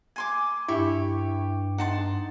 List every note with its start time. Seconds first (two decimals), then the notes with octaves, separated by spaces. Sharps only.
0.16 G#5 C6 D6
0.68 G2 E4 G4 C#6
1.78 D#4 F#5 A5 C6